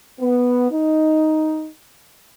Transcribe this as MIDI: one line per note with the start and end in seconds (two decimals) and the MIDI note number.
0.19 0.71 59
0.71 1.69 63